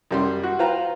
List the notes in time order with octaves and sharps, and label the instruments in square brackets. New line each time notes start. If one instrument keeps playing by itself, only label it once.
[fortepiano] F#2 G3 C6
F#4
F4 B4 C5 G5 A#5